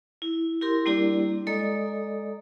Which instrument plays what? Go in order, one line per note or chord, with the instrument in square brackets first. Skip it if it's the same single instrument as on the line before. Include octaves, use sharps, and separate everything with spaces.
[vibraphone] E4
E4 G4 A#4 C6
G3 A#3 D4 E4 G4 D5
G#3 A4 D5 D#5 A#5 D#6